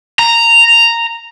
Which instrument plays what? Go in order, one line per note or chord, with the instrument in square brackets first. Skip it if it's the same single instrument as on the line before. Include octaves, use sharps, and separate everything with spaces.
[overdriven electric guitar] A#5